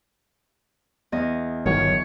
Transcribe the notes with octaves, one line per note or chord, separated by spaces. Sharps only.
E2 D#5
G1 D#3 F#3 C#5